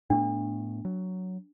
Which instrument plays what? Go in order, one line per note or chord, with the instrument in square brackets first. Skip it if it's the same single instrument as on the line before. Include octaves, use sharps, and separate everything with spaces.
[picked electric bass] A2 A3 B3 [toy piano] D4
[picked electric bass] F#3